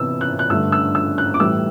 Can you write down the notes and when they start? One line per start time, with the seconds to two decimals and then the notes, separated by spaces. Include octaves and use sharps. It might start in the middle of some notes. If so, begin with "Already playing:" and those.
Already playing: C3 E3 B3 E6
0.21 F#6
0.39 F#6
0.50 G2 D3 A3 E6
0.72 E6
0.95 E6
1.18 F#6
1.34 D6
1.40 A2 E3 G3 E6